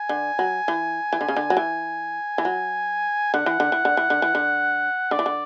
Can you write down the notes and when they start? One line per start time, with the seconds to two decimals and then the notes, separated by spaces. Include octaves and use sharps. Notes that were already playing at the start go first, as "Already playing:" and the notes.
Already playing: G#5
0.09 D3
0.39 F#3
0.68 E3
1.13 E3
1.21 D3
1.28 C#3
1.37 D3
1.50 F#3
1.57 E3 G#5
2.38 E3
2.45 F#3
3.34 D3 F#5
3.46 E3
3.60 D3
3.72 E3
3.85 D3
3.97 E3
4.10 D3
4.22 E3
4.35 D3
5.11 D3 D5
5.19 E3
5.26 D3